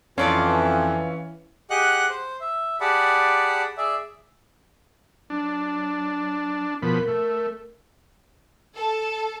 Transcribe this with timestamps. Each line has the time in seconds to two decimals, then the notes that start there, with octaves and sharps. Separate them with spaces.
0.18 F2 E3 C#4 F4 D5 F5
1.70 G4 G#4 D#5 F#5 F#6
2.10 C5
2.40 E5
2.80 G4 G#4 D5 F#5 A5 B5
3.77 G#4 D5 E5
5.30 F#3 D4
6.82 B2 F3 A#4 B5
7.08 A3
8.74 A4